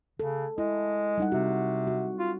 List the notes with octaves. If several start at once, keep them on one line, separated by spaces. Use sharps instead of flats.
C#3 A4
G#3 E4
G3 D#4 F#5
C3 C4 F#4
F#4
F4